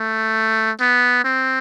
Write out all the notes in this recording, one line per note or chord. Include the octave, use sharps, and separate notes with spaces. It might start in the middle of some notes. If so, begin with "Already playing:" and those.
Already playing: A3
B3
C4